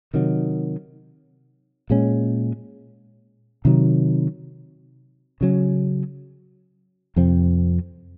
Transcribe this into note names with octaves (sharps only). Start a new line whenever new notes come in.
C3 D#3 F#3
A#2 G#3 C#4
C3 D#3 F#3
C#3 F#3 C#4
F2 C3 F3 C4